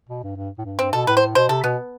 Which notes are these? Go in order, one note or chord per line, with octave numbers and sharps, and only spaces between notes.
B2
G2
G2
A2
G2
G2 C4
B2 A4
A2 B4
C5
B2 C5
C3 A4
B2 B3